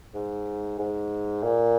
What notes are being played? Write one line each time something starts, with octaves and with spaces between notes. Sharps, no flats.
G#2
G#2
A#2